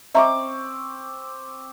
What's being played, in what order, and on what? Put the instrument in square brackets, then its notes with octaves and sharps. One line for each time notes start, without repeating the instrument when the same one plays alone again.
[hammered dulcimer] C4 C#6 D6 [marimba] D#5 E5 A#5